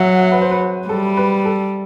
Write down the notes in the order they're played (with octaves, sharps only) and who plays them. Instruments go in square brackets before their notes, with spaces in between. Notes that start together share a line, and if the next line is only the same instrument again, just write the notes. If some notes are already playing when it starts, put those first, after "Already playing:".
Already playing: [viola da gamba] F#3 [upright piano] E5 F#5
[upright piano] B4
C5
B4
[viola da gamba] G3 [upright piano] A4
[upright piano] B4
A4